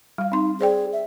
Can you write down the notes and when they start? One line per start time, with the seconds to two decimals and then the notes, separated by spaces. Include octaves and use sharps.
0.18 G3 F5
0.32 C4 D#4 C6
0.61 G#4 C5 D5 G5
0.93 E5